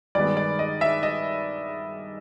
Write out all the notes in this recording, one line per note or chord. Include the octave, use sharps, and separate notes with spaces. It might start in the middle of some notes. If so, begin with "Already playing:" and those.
G2 D#3 G#3 B3 D5
D5
D#5
E5
D#5